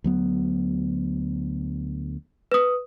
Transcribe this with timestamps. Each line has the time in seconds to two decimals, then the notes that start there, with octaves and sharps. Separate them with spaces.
0.04 D2 F#3 B3
2.52 B4 D#6